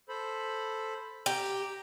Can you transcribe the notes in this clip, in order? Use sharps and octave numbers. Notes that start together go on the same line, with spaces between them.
A4 C5 B5
G4 A#5